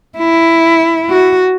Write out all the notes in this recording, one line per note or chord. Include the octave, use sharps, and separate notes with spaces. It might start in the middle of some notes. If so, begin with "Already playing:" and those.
E4
F#4